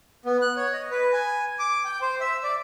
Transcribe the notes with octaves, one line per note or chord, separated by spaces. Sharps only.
B3
F#6
C#5
D#5
B4
G#5
D6
G5
C5
E5
D5